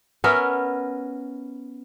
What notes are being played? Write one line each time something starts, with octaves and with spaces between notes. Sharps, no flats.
B3 C#4 A#4 E5